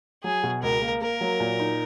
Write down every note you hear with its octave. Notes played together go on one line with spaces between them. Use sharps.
F#3 G#4
B2
C#2 A#4
A#3
A#3 A#4
F#3
A#2
D#4